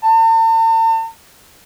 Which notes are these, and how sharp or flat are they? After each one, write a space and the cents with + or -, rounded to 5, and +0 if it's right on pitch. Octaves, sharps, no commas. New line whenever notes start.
A5 +45